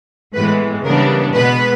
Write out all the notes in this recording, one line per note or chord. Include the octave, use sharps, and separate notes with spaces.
A2 E3 G#3 B3 B4
C#3 E3 G3 B3 D4 A#4
B2 G#3 B3 B4